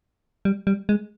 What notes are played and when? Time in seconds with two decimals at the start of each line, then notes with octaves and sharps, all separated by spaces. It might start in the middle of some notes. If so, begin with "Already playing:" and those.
0.45 G3
0.67 G3
0.89 G#3